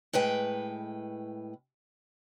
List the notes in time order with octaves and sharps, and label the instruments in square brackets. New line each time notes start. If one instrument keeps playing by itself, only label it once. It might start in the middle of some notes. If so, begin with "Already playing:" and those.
[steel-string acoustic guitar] A2 G#3 B4 G5